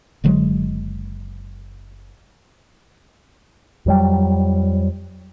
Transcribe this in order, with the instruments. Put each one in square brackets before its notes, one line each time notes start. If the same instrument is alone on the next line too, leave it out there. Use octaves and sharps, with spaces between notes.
[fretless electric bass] F#1 D3 F#3 G#3
[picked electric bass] F2 F#3 G3